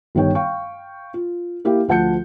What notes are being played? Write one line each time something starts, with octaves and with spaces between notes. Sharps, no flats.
G1 D#3 G3 C#5 G5
F5 G5 C#6
F4
A#3 E4 G4 F5
D2 F3 F#5 A5 G6 C#7